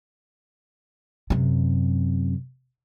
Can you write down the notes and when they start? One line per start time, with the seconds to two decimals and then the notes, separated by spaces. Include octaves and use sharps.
1.30 F#2 C3